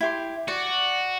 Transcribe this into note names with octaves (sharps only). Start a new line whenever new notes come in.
E4 G4 C6
F#4 D5